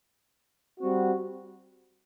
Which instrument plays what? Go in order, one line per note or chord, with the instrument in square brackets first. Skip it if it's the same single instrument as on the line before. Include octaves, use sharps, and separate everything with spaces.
[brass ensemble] G3 C4 F#4